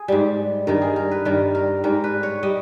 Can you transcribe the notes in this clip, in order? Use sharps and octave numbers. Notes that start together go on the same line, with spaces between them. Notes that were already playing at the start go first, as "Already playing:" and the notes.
Already playing: G#4
G#2 G3
G2 D#3 G3 A#4
G#4
A#4
B4
G2 D#3 G3 A#4
A#4
G#2 G3 A#4
B4
C#5
G3 D#5